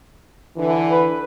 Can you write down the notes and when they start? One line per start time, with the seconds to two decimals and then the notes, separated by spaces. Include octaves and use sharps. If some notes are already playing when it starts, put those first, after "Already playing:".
0.56 D3 E3
0.90 B4